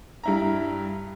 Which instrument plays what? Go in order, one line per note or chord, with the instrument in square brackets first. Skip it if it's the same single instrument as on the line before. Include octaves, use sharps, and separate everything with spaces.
[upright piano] G2 E4 A#5